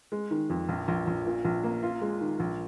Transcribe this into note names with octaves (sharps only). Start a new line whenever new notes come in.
G#3
D#3
F2
A#1
A#1
A#1
A#2
A#1
A#3
F4
G#3
D#3
A#1